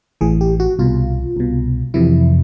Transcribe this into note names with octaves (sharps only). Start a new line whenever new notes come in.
A1 A2 E3 G#4
G4
F#4
C2 B2 F4
C2 B2
F2 C3 E3 E4